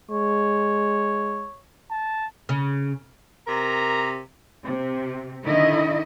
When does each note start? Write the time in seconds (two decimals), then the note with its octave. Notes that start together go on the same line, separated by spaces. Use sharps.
0.11 G#3 C#5
1.91 A5
2.49 C#3
3.46 C3 A#4 A#5
4.65 C3
5.44 D3 D#3 E4 D#5